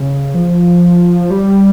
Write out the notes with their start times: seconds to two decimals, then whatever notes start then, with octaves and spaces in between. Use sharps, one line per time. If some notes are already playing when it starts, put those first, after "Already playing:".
Already playing: C#3
0.34 F3
1.30 G3